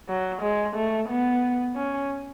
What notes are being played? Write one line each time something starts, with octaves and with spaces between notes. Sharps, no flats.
F#3
G#3
A3
B3
C#4